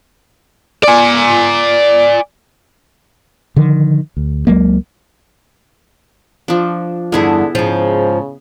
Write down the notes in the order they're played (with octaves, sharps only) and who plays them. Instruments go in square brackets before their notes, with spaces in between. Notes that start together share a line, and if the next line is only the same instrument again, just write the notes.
[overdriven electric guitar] D5 G#5
[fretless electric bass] D3 D#3 F3
D2
C#2 F#3 G#3 A#3
[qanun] F3 D4
[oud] E2 G2 [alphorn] D3 [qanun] B3 E4 G#4
[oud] G#2 F3 [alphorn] C#3